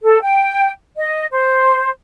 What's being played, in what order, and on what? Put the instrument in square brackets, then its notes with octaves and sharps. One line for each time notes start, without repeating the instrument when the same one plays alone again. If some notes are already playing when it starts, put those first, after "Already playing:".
[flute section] A4
G5
D#5
C5